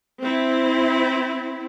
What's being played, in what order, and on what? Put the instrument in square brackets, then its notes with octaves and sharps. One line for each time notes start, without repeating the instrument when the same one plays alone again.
[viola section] C4 E4